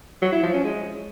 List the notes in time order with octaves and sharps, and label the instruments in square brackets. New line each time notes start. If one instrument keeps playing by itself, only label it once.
[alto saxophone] F#3
E4
F3
C#4
G#3